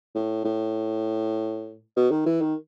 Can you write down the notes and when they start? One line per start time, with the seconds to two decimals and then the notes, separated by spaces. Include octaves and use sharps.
0.15 A2
0.45 A2
1.96 B2
2.11 D#3
2.26 E3
2.41 D#3